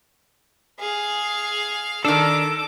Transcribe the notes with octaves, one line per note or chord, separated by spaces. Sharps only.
G#4 F5
D#3 D4 A4 D6